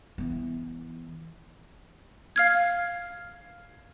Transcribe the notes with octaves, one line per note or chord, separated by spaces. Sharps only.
E3 B3
F5 F6 G#6